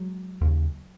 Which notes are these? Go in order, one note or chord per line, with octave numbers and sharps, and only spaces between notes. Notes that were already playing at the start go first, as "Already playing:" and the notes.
Already playing: F#3 G#3
D#2 C#3